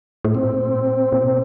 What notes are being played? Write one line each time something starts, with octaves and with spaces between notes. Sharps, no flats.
A2
A#2 C4
A#2
B2